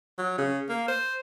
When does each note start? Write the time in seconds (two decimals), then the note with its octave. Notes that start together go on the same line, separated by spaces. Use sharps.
0.18 F#3
0.38 C#3
0.69 A#3
0.88 C5